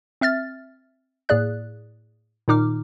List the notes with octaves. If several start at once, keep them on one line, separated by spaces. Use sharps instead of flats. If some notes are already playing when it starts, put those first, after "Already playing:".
C4 E5 F6 A6
A2 A#3 G#4 D5 F#6
A#2 D#3 D#4 D6 F6